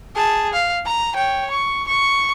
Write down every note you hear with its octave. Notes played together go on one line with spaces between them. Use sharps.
G#4 A5
F5
A#5
C#5 G5
C#6
C#6